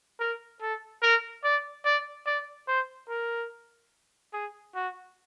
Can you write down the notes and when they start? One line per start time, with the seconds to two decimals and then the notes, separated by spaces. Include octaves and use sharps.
0.20 A#4
0.61 A4
1.03 A#4
1.44 D5
1.85 D5
2.26 D5
2.68 C5
3.09 A#4
4.33 G#4
4.75 F#4